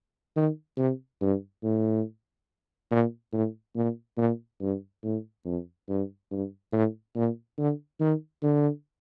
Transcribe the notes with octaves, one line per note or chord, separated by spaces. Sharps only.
D#3
C3
G2
A2
A#2
A2
A#2
A#2
G2
A2
F2
G2
G2
A2
A#2
D3
D#3
D3